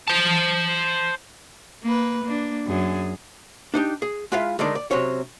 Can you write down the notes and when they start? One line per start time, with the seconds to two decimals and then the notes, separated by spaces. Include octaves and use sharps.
0.08 C5 A5
1.83 A#3 B4
2.23 A#3 D4
2.67 F#2 G#4
3.74 D4 D#4 G4
4.02 G#4
4.32 G#3 E4 F4 E5 F5
4.59 D3 D#3 G#3 D4 D#4 D5
4.75 D5
4.91 C3 F#3 C4 C#4 C#5